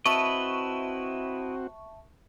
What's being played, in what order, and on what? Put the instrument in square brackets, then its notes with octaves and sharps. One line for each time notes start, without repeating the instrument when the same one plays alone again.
[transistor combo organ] C4 F#4 [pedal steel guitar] E4 B4 D#5 [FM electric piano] E5 A5 C#6